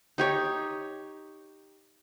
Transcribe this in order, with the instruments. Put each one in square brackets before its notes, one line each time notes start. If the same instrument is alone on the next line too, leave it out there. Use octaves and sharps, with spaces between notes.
[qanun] D#4 G4 C#5